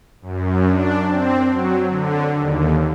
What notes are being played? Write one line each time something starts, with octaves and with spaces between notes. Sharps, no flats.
F#2
D4
C4
F#3
D3
D#2